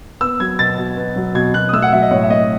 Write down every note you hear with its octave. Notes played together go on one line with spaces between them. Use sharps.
B3 E6
F#3 G#6
B2 A6
B2
B3
F#3
B2 G#6
B2 F#6
D#6
A3 E6
F#5
F#3 E5
D#5
A2 C#5
E5
A2 D#5